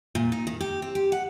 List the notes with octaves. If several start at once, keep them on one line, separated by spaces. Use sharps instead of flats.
A#2
D#4
D#3
G4
C4
G4
F#5